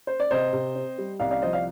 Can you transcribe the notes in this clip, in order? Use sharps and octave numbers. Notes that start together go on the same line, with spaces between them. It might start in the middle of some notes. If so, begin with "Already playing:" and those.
C5
D5
C3 C5 D#5
C3
C4
G3
C2 D5 F5
D5 F5
F3 C5 D#5
D5 F5